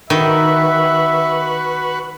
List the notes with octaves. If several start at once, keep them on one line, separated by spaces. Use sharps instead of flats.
D#3 F#4 B4 E5